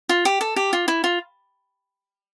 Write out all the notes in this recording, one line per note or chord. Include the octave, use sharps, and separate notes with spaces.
F4
G4
A4
G4
F4
E4
F4